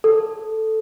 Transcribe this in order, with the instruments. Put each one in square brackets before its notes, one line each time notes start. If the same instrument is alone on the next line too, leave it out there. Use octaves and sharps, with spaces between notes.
[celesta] A4